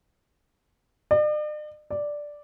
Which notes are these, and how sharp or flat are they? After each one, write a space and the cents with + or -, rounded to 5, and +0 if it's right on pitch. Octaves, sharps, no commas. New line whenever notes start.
D5 +45
D5 +0